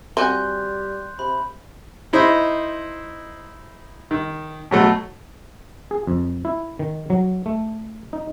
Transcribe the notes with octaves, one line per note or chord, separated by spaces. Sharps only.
G3 C4 F#4 G#5 C6 F#6 G6
C3 B5
D#4 E4 C5 D#5
D#3
B2 F#3 A3
G#4
F2
E4
D#3
F#3
A3
D#4